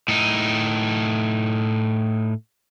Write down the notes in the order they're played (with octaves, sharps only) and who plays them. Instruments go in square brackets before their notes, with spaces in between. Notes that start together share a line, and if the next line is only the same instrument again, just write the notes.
[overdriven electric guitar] A2 D#4